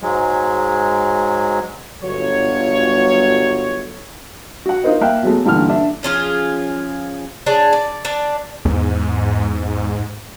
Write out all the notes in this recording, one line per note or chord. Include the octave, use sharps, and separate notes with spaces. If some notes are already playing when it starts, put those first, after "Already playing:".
G#2 F#3 G#3
G1 F#3 F4 C#5
F#4 F#5
D#4 F4 A#4 C5 D#5
A#3 E5 F5 G5 F#6
B2 F#3 G#3 A3
A1 G2 A#2 D3 E3 F6
D4 E5
F3 C#4 F4 G#4
D4 G#4 C#5
D5
D4 D5
E2 G#2